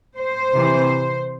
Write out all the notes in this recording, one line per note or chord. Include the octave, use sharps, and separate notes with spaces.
C5
C3 E3